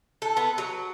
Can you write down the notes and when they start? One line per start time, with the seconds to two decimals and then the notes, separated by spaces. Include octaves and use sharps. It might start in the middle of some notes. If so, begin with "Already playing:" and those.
0.22 A4
0.37 B3
0.58 F#3